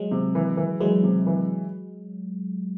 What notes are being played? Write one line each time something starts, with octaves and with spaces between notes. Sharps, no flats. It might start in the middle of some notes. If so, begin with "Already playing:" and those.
Already playing: F#3 G#3
C3
E3
E3
E3 F#3 G#3
C3
E3